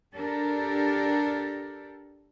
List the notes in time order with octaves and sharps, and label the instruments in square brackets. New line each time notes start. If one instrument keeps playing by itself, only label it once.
[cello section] D4 G4 A4 A#4